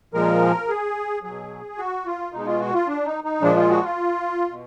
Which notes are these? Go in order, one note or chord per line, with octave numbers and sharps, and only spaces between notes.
A#2 F3 G#3 A#4
G#4
B2 F#3 G#4
F#4
F4
B2 G#3 D#4
F4
F#4
F4
D4
D#4
D#4
A#2 F3 G#3 D4
F4
F#4
F4
B2